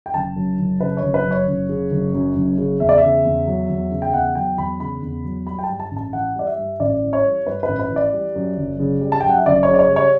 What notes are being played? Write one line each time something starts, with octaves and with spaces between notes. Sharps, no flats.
G5
F#1 A5
F#2
F#1
C#3 B4
C#5
F#1
B4
F#2
C#5
F#1
C#3
F#1
F#2
F#1
C#3
E2 E5
D5
C#3 E5
E2
F#3
E2
C#3
G5
E2 F#5
F#3 G5
E2 B5
C#3 B5
E2
F#3
G3 B5
G5
A5
G2
A5
A1
A5
E3 F#5
G3 D5
E5
G2
A1 D5
E3
C#5
G3
G2 B4
B4
A1
B4
E3
D5
G3
F#2
F#1
C#3
G3
A5
F#2 G5
F#5
E5
F#1 D5
C#5
C#3
D5
C#5
G3
C#5